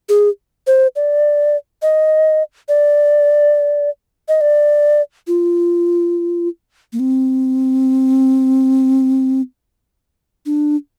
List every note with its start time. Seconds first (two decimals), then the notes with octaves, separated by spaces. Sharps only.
0.09 G#4
0.67 C5
0.96 D5
1.82 D#5
2.68 D5
4.28 D#5
4.41 D5
5.27 F4
6.93 A#3
6.99 C4
10.46 D4